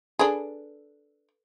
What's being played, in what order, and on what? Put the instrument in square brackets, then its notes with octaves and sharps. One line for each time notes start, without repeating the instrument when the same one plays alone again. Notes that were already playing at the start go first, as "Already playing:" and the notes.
[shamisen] D4 G#4 [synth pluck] A4 B4